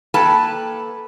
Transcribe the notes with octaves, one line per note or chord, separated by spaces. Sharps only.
A#3 A4 B4 G5 A5